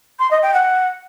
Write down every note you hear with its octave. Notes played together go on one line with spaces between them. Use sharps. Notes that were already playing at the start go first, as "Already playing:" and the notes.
C6
D#5
G5
F#5